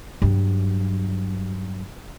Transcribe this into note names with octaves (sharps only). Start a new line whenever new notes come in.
G2 F#3